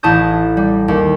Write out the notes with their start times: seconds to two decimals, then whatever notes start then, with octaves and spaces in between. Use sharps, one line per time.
0.03 A1 E4 A5 D#6 G6
0.57 G3
0.88 D#2